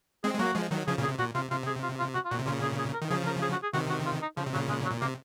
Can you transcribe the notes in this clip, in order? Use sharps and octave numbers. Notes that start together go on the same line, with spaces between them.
G#3 C4 G#4
G#3
F#3 A#3 F#4
F3 G#3
D#3 F#3
C#3 F3 G#4
A#2 C#3
G#4
C3
A#2 F#4
C3 F4
C3 F4
G#4
F4
F4
F#4
F4
A#2 F#4
C3
A#2 C#3 F4
G#4
G#4
A#4
D#3
C#3 F3 G#4
A#4
G#4
F#4
G#4
C3 D#3 F#4
F#4
F4
D#4
C#3 F3
C3
A#2 C#3 F#3
G#3
F#3
A#2
C3 A#3